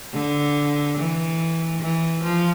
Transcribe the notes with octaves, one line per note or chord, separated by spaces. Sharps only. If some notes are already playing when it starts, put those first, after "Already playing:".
D3
E3
E3
F3